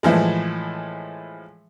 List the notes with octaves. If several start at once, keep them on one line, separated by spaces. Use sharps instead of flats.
A2 E3 F3 G#3